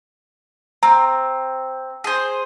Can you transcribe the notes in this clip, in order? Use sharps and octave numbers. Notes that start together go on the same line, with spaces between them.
C4 A#5
G#4 C5